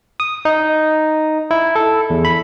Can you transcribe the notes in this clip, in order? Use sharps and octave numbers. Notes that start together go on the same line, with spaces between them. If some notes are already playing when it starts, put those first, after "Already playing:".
D#6
D#4
E4
A4
E2
B5